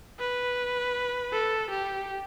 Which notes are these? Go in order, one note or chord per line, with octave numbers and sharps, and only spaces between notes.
B4
A4
G4